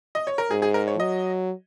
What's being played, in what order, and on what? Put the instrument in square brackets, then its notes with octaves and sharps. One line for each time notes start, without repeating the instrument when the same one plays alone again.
[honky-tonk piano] D#5
C#5
A#4
[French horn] G#2 [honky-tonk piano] G#4
[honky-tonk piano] G#4
A#4
C#5
[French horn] F#3 [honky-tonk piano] D#5